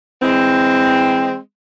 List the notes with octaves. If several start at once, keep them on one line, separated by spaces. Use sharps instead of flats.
E3 G#3 C4